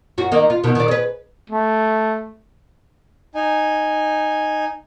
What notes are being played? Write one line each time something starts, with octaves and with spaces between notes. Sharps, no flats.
F#2 F#4
D#3 A#3 D#4
F4
B2 D#3
D#3 D5
G#4 B4
A3
D#4 G#5